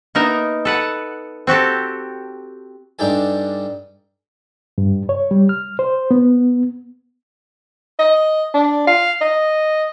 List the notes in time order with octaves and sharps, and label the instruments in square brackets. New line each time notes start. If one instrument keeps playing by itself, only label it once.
[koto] A#3 B3 D#4 A#4 E5
A4 B4 F#5
C4 F#4 G4 A4
[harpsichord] G2 D4 D#4 G4 A4 G#5
[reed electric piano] G2
C#5
G3
F6
C5
B3
[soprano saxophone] D#5
D4
F5
D#5